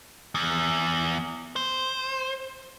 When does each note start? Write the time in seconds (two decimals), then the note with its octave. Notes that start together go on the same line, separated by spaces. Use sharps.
0.35 E2
1.56 C5